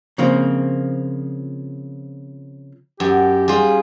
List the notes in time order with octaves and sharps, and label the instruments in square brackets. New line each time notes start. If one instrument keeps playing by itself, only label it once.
[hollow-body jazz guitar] C#3 F3 A#3 C4
[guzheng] F#2 [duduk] G4
[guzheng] G3 F4 [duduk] G#4